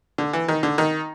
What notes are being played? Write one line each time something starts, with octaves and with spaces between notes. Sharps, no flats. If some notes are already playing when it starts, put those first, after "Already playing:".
D3
E3
D#3
D3
D#3